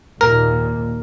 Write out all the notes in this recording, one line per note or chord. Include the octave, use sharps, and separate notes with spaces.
D#2 A#2 A#4